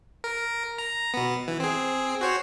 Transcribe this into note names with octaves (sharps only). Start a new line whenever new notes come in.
A#4
A#5
B2 B3
E3
C4 G#4
F#4 C5 C#5